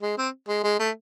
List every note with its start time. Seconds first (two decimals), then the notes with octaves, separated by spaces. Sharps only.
0.02 G#3
0.18 C4
0.49 G#3
0.64 G#3
0.79 A3